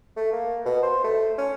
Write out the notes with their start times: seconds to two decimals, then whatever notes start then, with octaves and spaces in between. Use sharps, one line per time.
0.16 A3
0.33 A#3
0.65 B2
0.83 C5
1.04 A3
1.38 C#4